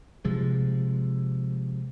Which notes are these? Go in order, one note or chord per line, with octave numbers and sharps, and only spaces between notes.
C3 F3 G#3